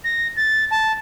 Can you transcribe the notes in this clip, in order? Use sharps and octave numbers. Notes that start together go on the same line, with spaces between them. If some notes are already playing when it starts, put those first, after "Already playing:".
A#6
A6
A5